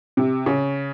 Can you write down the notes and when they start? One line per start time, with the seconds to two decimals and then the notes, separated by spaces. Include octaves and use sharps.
0.17 C3
0.46 C#3